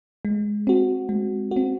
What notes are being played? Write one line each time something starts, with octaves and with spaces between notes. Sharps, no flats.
G#3
C4 F#4
G#3
C4 F#4